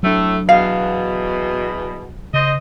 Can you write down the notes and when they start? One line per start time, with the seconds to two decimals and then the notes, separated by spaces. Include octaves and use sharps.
0.03 A2 F#3 A3 D4
0.49 E2 B2 F5
2.33 C#3 C5 D#5